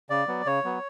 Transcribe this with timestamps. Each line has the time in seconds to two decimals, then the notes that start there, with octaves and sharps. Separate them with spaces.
0.10 C#3 D5
0.28 F#3 B3
0.46 C#3 C#5
0.65 F#3 B3